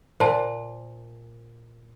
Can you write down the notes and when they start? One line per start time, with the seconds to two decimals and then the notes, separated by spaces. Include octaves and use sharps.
0.20 A#2 C5 A5